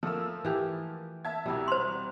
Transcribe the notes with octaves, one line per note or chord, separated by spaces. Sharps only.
F3 A3 A#3 E6
E3 G4
E5 A5 G#6
C2 B2 G3 E4
C5 C6